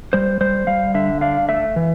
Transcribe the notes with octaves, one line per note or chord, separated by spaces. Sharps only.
G3 C5
G3 C5
G3 F5
D3 E5
D4 F5
A3 E5
E3